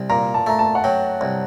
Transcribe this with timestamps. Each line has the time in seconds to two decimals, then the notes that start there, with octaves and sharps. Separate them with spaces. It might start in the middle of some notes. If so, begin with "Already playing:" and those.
Already playing: C2
0.10 A#2 A#5
0.34 A5
0.46 A3 A#5
0.59 A5
0.75 F#5
0.84 F#3 G5
1.21 C2